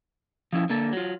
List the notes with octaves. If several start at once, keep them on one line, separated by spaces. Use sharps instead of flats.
F3 C#4 E4
D3 A#3 A4
F#3 F4